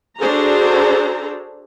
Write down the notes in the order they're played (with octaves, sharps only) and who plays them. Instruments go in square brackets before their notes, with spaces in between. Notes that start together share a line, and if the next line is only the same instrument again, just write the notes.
[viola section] D4 F#4 G#4 A4 C5 A#5